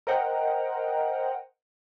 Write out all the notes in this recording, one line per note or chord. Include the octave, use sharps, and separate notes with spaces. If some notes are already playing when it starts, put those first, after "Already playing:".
A#4 C5 D#5 F#5 G5 A#5